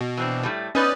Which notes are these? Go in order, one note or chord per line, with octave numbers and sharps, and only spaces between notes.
B2
E3 C4 D4
A2 G3 A3
B3 C#4 D#4 B4 D5 D#5